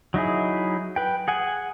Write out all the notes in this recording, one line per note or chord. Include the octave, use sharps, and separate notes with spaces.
F#3 D#4 E4 G#4
B4 G5
G#4 F#5 G#5